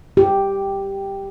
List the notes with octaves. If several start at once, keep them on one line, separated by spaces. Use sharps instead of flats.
G4